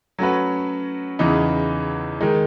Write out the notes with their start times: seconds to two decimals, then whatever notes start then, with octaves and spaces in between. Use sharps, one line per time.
0.19 F#3 A3 C#4 F#4 B4
1.19 E2 C#3 E3 B3 D#4
2.21 D#3 G#3 D#4